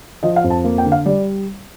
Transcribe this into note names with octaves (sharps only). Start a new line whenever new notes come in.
F3 D#5
F5
F2
A5
A#3
G5
D3
F5
G3 D5